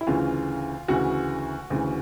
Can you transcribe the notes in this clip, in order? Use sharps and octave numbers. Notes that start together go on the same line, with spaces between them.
E4
D2 C#3 E3 F4
D2 C#3 E3 F#4
D2 C#3 E3